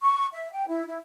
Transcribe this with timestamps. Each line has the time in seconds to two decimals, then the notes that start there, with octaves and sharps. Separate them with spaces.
0.03 C#6
0.33 E5
0.53 G5
0.67 E4
0.87 E4